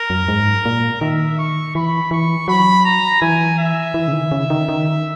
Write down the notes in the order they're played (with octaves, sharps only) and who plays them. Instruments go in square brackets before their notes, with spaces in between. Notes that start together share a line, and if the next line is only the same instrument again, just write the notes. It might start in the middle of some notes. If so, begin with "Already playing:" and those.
Already playing: [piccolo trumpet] A#4
[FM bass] F#2
G#2
A#2
[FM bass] D#3 [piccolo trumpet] E5
[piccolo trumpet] C#6
[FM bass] E3 [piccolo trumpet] B5
[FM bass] E3 [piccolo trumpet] C#6
[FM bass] F#3 [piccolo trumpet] B5
[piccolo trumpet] A#5
[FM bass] E3 [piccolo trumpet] G#5
[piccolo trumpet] E5
[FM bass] E3
C#3
D#3
C#3
D#3
D#3